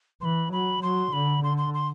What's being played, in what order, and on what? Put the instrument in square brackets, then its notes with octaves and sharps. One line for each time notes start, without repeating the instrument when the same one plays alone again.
[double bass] E3 [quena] B5 C6
[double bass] F#3 [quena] B5
[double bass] F#3 [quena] C6
[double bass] D3 [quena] B5
[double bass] D3 [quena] C6
[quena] C6
C6